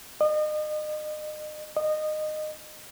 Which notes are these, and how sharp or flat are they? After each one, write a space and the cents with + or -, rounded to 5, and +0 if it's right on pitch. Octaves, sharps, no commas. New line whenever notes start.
D#5 -35
D#5 -20